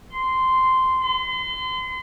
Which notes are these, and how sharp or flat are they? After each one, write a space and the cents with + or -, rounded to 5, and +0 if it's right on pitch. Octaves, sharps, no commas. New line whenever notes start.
C6 -10
C6 -35